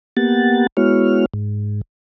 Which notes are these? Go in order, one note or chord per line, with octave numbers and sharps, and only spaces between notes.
A#3 B3 G4 F#5 A6
G#3 B3 E4 F#4 C#5 F6
G#2